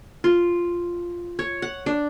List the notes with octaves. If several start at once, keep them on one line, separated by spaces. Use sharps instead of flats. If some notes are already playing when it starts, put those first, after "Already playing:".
F4
C#5
F#5
D4